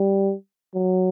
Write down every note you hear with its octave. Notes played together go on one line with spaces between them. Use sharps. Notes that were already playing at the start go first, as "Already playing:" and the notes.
Already playing: G3
F#3